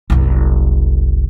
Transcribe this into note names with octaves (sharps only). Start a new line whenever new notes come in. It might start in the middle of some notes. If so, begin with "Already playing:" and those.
F#1 C2